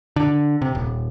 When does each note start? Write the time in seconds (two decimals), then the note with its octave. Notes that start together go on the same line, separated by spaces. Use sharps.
0.16 D3
0.62 C3
0.75 D#1